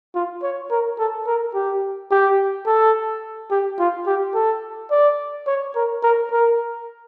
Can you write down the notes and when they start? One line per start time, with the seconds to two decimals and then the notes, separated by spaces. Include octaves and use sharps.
0.15 F4
0.43 C#5
0.71 A#4
0.99 A4
1.27 A#4
1.54 G4
2.11 G4
2.66 A4
3.51 G4
3.79 F4
4.07 G4
4.35 A4
4.91 D5
5.47 C#5
5.75 A#4
6.03 A#4
6.31 A#4